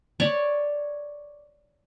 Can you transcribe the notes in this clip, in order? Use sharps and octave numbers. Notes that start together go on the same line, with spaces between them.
C#5 D5